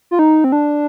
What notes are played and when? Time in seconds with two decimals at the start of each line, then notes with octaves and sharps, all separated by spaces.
0.11 F4
0.19 D#4
0.44 C4
0.52 D4